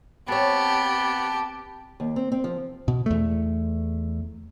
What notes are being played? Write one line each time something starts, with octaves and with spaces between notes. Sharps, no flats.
B3 C4 G4 C#5 A5
D#2
C4
C4
F3
B2
E2 A3